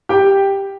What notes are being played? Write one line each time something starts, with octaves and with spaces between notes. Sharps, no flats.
G4 G5